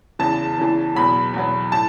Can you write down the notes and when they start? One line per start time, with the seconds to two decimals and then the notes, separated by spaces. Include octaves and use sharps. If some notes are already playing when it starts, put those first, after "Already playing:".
0.19 E2 C#3 E3 A5
0.58 E2 C#3 E3
0.95 E2 B2 F#3 B5
1.34 E2 B2 F#3
1.72 A2 A5